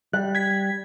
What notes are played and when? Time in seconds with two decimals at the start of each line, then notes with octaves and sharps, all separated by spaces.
0.13 G3 F#6
0.35 G#6 B6